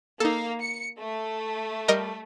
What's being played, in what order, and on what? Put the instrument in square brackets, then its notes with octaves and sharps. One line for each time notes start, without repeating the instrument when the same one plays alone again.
[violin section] A#3 F5 [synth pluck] D#4 A4
[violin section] C#7
A3
[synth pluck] G3 A#4 D#5